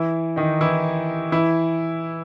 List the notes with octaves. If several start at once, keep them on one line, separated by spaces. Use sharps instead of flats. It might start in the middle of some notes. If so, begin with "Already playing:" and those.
Already playing: E3 E4
D#3 D#4
E3 E4
E3 E4